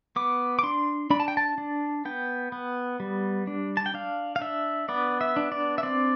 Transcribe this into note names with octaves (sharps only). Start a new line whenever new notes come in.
B3 D6
D6
D4 C6
D4 B5
A5
G5
A5
D4
B3 G5
B3
G3
D4
A5
G5
D4 F5
F5
D4 E5
B3 D5
E5
D4
D5
E5
C4 D5